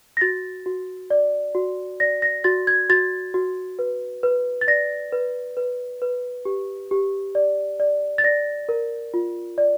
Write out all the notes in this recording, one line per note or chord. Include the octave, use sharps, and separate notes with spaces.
A#6
F#4 A6
F#4
D5
F#4
D5 A#6
A#6
F#4 A6
G#6
F#4 A6
F#4
B4
B4
A6
D5 A#6
B4
B4
B4
G4
G4
D5
D5
A6
D5 A#6
A#4
F4
D5